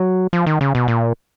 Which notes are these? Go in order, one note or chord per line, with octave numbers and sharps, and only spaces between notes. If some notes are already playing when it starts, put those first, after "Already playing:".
Already playing: F#3
F3
D#3
C#3
B2
A#2